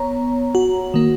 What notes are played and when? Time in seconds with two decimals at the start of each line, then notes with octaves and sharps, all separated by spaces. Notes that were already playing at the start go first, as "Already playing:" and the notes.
Already playing: B3 C#5 A#5
0.55 F#4
0.94 D#3 A#3